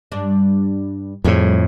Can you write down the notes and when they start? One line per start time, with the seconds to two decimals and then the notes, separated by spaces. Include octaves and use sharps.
0.12 G2 D4
1.24 F2 A2 G3 G#4 F5